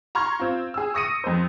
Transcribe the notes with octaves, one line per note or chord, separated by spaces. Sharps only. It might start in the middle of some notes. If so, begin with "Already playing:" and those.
A#5 C6 C#6 F6 G#6
C4 F4
G#4 E6
C#6 D#6 A#6 C#7 D#7
F2 C5